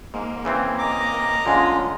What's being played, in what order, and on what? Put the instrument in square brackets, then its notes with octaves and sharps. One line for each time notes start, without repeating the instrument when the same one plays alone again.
[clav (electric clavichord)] G#2 [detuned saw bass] A#3
[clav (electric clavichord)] C#3 E3 C4
[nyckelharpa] D#5 A#5 [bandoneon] D6
[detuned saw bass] D1 [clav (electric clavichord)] D3 G#3 [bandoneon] C#4 F4